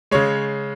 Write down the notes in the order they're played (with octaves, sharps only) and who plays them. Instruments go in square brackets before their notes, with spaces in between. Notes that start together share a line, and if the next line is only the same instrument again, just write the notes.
[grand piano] C#3 G#3 C#5